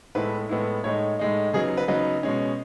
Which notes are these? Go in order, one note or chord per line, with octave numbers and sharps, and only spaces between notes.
A2 G#3 B3 E4 B4
A2 G#3 B3 E4
A2 G#3 D#4 C#5
A2 G#3 D#4
C#3 F#3 B3 D#4 G#4
B4
C#3 F#3 B3 D#4 B4
B2 G#3 C#4